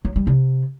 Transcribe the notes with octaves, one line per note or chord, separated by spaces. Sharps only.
F#3
G3
C3